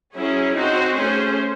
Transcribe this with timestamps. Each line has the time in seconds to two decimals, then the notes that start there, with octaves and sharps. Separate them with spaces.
0.16 F#3 C#4 E4 G#4
0.56 C4 D#4 F#4 C5
0.96 A3 C#4 G#4 C5